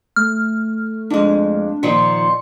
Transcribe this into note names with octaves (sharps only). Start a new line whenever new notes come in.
A3 F6
F2 G#3 D4
A#2 D#3 F3 C6 C#7